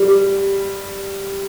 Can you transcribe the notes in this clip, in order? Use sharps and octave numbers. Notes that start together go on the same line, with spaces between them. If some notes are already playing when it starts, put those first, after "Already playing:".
Already playing: G3